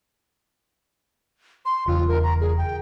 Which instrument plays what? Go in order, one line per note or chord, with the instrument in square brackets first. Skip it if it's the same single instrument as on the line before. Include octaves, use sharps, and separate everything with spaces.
[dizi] C6
[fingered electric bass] E1 E2 C#3 [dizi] F4
[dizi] A#4
A#5
G#4
G5